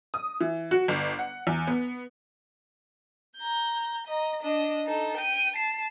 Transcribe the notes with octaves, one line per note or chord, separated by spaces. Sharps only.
D#6
E3
F#4
G1
F#5
E2
B3
A#5 G6
D#5 A#5
D4 D#5
D#4 A4
G5 D#7
A5 C7